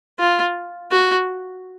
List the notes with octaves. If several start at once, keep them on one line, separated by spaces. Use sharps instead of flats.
F4
F#4